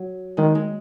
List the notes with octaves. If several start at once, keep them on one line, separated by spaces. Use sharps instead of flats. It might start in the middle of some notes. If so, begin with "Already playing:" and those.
Already playing: F#3
D#3 G#3
G#3